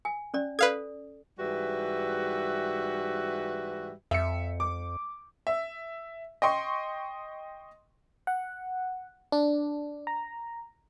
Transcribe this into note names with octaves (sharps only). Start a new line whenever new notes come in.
G#5
C#4 D5
A4 B4 D5 F5 G#6
G#2 E3 G3 F#4 B4 E5
F2 E5 C#7
D6
E5
D#5 G5 C6 C#6
F#5
D4
A#5